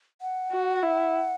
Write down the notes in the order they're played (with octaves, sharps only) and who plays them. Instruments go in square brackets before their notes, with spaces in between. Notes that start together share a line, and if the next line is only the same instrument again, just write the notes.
[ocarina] F#5
[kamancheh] F#4
E4